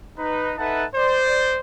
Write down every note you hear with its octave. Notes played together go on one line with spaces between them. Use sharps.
D#4 B4
D#4 A4 B4 E5 F#5 A5
C5 D5